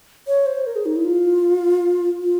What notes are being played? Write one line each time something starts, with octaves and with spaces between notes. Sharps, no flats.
C#5
C5
A#4
G#4
D#4
E4
F4
F4